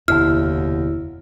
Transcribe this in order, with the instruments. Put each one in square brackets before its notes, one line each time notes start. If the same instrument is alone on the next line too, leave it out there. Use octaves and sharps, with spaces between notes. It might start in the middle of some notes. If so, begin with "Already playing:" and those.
[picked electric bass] F1 B2 D3 [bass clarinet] D#2 [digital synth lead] E4 [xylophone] F6